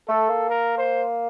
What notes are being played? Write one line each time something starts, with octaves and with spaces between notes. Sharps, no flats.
A3 A4
A#3
A#4
C5